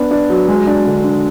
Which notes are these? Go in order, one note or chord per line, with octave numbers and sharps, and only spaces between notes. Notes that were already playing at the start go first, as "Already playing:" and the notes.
Already playing: B3 D4
D4
F#3
G#3
D4
D3
D4